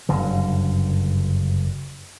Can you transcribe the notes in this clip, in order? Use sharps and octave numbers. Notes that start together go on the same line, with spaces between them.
F#1 G2 D3